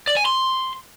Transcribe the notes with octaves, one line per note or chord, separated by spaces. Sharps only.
D5
G#5
C6